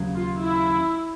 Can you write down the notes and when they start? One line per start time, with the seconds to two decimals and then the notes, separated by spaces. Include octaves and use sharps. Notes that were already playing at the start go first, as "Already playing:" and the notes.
Already playing: D#2 C#3 F#3
0.15 F4
0.43 E4